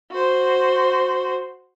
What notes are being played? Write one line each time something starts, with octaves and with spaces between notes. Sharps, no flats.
F#4 C5